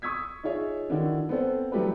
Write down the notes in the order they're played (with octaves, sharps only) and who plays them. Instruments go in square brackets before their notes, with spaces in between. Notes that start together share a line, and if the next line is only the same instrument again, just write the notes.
[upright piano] C#6 D#6 E6 G#6 B6
D#4 F4 G#4 C#5 E5
D3 D#3 D4 E4 F#4
B3 C4 A4 C5
E3 F#3 G3 A3 G4 B4